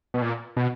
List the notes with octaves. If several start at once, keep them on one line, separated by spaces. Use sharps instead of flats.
B2
A#2
B2